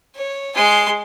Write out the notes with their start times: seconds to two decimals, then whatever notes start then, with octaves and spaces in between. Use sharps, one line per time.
0.16 C#5
0.56 G#3 C6